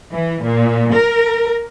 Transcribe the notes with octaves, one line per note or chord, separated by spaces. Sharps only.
E3
A#2
A#4